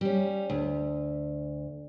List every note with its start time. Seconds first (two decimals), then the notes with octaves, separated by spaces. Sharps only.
0.01 G3 C#4
0.50 D2